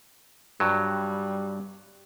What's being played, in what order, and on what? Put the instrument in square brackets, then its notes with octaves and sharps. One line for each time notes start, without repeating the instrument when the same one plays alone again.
[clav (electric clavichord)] G2 F#3 [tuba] G3